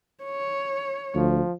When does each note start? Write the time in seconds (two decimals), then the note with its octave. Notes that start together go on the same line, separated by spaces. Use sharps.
0.24 C#5
1.15 D2 F3